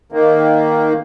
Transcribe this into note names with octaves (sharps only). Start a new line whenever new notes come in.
D#3 A#3